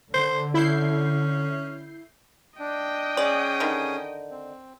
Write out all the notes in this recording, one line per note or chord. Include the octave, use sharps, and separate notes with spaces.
D3 C5
C#4 E4 G6 C7
D4 D#5 G5
C#4 G#4 D5 D#6
D3 D#3
C4